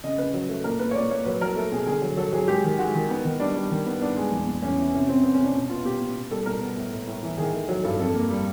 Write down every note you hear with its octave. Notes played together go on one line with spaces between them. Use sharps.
C#3 D#5
C#3 B4
F#3
A3
A#2 A#4
A#2 B4
C#5
A#2 D5
A#2 C#5
F#3 B4
F#3 A#4
A3 A4
B2 G#4
D3 G#4
F#3
F#3 A4
F#3 G#4
G#3 G4
D#3
G#3 F#4
D#3
B3
D#3
G3 D4
G3
D#3
B3
B3 D4
G#3
E2
E2
E2 C#4
E3
C3 C#4
C3 C4
B3 C4
C#4
C3 D4
B2
B3 F4
B2 G4
B2
B2
G3 A4
B2 A#4
B3
A2
A2
A2
E3
D#3 G#4
A3
F#3
G2 A4
F2 A4
A#3
G3